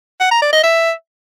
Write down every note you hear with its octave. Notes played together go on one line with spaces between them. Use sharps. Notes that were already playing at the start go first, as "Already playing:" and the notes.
F#5
A#5
D5
D#5
E5